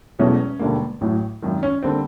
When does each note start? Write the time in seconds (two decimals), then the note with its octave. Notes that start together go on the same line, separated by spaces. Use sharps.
0.19 E1 E2 B2 F#3 A3 C#4
0.59 E1 D#2 D3 G3 A#3
1.01 A1 A2 F#3
1.42 G#1 F#2 D#3
1.63 C#4
1.83 D3 G3 A#3 C4